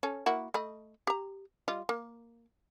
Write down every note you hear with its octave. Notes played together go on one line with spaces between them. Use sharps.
C#4 A4
A#3 E4 F#4
A3 D#5 B5
G4 A#5
G3 F4 D#5
A#3